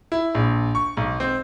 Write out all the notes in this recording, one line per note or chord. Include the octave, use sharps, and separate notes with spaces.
E4
A#1
C#6
B1
C4